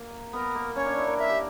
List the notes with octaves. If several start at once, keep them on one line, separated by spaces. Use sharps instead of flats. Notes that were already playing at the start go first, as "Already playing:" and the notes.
Already playing: A#3
B3 A#4
A#3
C#4 C#5
D4
E4
A#4
A#4 E5
G4